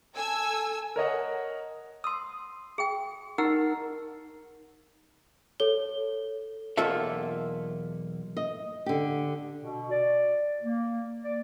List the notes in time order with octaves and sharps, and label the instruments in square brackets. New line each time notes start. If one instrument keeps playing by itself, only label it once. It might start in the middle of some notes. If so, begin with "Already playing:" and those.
[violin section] A4 G#5 E6
[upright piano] A#4 C#5 D#5 F#5
[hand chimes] C6 D#6 [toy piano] E6
[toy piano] G#4 G5
[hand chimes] D#4 [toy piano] G4 F#5 E6 [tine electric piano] A#4
[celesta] A4 C#5 G7
[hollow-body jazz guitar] B1 E2 A#3 F4 A4 E5
[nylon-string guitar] D#5
D3 G4
[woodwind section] B2
D5
A#3
D5